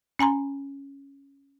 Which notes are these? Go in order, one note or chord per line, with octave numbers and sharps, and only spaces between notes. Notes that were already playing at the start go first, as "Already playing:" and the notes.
C#4 G#5 A#5 C6